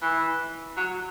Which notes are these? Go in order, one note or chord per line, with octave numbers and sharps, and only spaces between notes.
E3
F#3